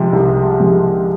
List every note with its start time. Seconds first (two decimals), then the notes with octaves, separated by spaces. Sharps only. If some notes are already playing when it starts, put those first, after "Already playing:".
Already playing: C3 F3 G#3
0.13 C2
0.60 C3 F3 G#3